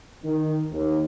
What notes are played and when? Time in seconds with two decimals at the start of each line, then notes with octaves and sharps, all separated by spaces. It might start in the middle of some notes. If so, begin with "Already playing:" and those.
0.24 D#3
0.71 D#2